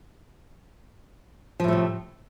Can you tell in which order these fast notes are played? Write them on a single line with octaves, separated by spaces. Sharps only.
F3 A2 A3 C3